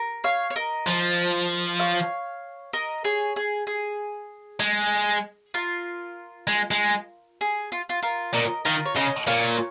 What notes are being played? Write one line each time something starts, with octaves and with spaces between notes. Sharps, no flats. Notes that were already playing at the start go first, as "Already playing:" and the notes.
Already playing: A#4
C#5 F5
C#5
A#4 D#5
F3
C#5 F5
A#4 D#5
G#4 C#5
G#4
G#4
G#3
F4 A#4
G#3
G#3
G#4
F4
F4
F4 A#4
A#2 A#4 D#5
D#3 F4 A#4
C#5
C#3 A#4 D#5
A#2 C#5 F5